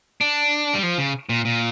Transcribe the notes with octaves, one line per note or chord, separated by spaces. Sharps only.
D4
G3
F3
C#3
A#2
A#2